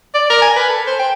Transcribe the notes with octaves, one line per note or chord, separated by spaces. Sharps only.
D5
A#4
G#5
B4
A4
C5
G5